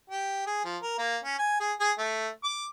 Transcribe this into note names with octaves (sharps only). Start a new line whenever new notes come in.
G4
G#4
F3
A#4
A#3
C#4
G#5
G#4
G#4
A3
D6